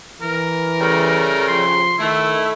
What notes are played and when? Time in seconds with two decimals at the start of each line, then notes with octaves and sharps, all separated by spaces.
0.22 E3 A#4
0.79 C#3 G3 A3
1.48 F3 C6
1.98 D#3 A3 E4